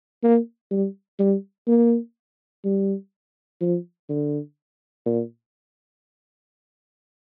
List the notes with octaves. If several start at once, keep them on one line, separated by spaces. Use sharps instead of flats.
A#3
G3
G3
A#3
G3
F3
D3
A#2